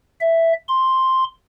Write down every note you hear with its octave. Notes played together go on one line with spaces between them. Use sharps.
E5
C6